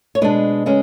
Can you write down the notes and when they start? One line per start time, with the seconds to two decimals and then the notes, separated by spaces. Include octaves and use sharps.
0.15 C#5
0.21 B2 G#3 D4 B4
0.66 C#3 G#3 C#4